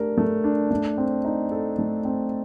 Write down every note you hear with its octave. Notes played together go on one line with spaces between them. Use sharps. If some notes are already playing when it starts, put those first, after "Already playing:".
Already playing: A3 D4 G4 A#4
A3
D4
A3
C4
D#4
A4
A3
C4